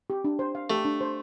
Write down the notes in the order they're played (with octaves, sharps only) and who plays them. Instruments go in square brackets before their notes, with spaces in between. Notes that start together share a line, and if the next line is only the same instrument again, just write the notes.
[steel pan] G4
D4
C5
F5
[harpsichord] A3 [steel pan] G4
[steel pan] D4
C5